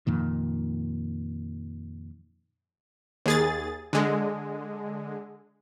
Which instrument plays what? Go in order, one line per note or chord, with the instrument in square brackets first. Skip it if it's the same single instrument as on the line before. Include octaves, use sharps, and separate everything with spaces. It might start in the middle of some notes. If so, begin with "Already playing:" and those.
[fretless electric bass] F2 A#2 D#3
[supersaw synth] D#2 G#4 A6
D3 G#3